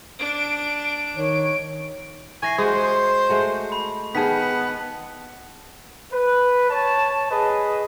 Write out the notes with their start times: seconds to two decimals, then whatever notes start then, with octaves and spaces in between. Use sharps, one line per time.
0.19 D4 D7
1.17 D#3 C#5
2.43 E3 G#5 C#6 A#6 C7
2.58 G#3 F#4 C5 D#6
3.29 G#3 A3 F#4
3.72 B5
4.15 D#3 B3 G#4 A5 B6
6.11 B4
6.69 C#5 A5
7.30 G#4 B4 D#5